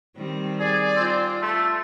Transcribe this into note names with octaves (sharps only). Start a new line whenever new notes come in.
D#3 G3 C4
G#4 D5
C4 F4
A3 C6